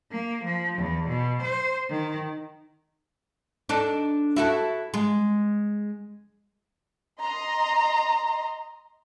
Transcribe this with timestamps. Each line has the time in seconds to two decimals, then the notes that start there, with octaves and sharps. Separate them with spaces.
0.11 A#3
0.44 F3
0.78 E2
1.09 B2
1.42 C5
1.90 D#3
3.69 D4 D#4 A4
4.36 E4 F#4 A4
4.94 G#3
7.21 D#5 A#5 C6